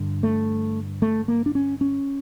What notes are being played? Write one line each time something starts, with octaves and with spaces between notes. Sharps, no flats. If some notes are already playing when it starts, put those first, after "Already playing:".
Already playing: G2 D3
A3
A3
A#3
D4
C#4
C#4